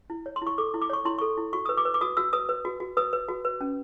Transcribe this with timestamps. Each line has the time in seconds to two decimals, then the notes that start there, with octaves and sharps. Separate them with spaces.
0.10 E4
0.26 C#5
0.36 C6
0.42 E4
0.47 C#6
0.58 A4 D6
0.74 E4
0.82 D6
0.90 C#5 C#6
1.05 E4 C6
1.18 A4 C#6
1.37 E4
1.53 F#4 C#6
1.65 B4 D#6
1.77 D6
1.85 B4
1.94 D6
2.01 F#4 D#6
2.17 F#4 E6
2.33 B4 D#6
2.49 B4
2.65 F#4
2.80 F#4
2.97 B4 D#6
3.13 B4
3.28 F#4
3.45 B4
3.61 C#4